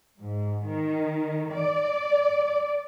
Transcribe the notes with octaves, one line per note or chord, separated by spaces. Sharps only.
G#2
D#3
D5